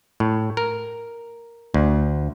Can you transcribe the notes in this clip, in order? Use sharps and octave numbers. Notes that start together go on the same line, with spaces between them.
A2
A#4
D2